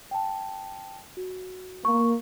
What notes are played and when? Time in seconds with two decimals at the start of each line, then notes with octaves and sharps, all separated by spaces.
0.11 G5 A5
1.17 F#4
1.85 A#3 C#6